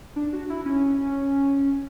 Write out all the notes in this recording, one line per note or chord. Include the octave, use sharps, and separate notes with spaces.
D4
F#4
E4
C#4